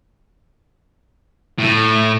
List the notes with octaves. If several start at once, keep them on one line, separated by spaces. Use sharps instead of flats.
A2